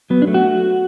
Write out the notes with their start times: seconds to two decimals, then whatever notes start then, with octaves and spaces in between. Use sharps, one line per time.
0.10 F#3 B3
0.22 D4
0.27 A3
0.34 F#4